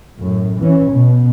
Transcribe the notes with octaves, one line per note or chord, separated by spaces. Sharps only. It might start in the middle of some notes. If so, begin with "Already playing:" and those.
F#2 A2
E3 C#4
B2